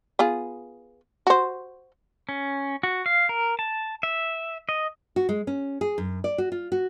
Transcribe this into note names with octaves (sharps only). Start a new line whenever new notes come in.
B3 F4 G#4
F#4 C5
C#4
F#4
F5
A#4
A5
E5
D#5
F#4
G#3
C#4
G#4
F#2
D5
F#4
F4
F#4